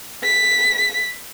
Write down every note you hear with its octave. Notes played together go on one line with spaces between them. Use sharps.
B6